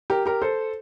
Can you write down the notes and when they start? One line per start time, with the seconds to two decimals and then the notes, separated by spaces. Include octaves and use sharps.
0.10 G4 A#4
0.26 G4 A#4
0.42 A4 C5